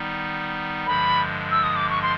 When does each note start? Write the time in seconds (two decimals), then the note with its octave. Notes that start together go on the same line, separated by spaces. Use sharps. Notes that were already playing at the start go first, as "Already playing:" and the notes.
Already playing: D#3 G3 B3 D#4
0.87 G2 D3 F3 G#3 B5
1.51 E6
1.64 D#6
1.76 D6
1.90 C#6
2.02 C6